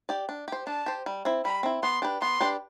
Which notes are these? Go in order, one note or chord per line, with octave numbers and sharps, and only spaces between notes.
G4 D5
D4
G4 C5
D4 A5
G4 C5
G3
C4 E4
G3 B5
C4 E4
B3 C6
D4 G4 B4
B3 C6
D4 G4 B4